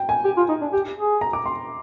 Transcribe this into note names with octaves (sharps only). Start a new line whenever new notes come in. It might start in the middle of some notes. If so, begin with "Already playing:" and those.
Already playing: G5
G#5
G4
F4
D#4
D4
G4
G#4
A#5
D6
C6